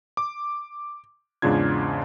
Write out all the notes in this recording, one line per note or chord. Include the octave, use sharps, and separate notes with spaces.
D6
E2 G#2 C#3 D4 F4 G#6